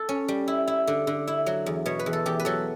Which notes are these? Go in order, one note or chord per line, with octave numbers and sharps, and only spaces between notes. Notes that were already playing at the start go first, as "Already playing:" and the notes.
Already playing: A4
C#4
G3
E4
E4
D3
D3
E4
F#3
E2
B2 C#5
B4
E2
A4
E2 G4
B4
F#3 A4